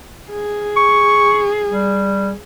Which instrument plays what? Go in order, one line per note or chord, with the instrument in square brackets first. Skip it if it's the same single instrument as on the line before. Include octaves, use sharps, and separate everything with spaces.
[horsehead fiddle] G#4
[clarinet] C#6
G3